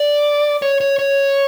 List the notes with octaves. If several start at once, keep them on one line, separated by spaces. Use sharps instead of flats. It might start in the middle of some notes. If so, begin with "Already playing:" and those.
Already playing: D5
C#5
C#5
C#5